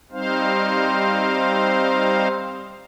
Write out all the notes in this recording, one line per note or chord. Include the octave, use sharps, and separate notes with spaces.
G3 C4 D#4 C5 F5